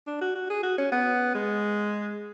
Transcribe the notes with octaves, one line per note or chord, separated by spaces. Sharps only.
D4
F#4
F#4
G#4
F#4
C#4
B3
G#3